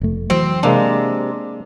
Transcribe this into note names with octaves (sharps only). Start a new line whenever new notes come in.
F1 A3
E3 F#3 C4
C3 G#3 A#3 D4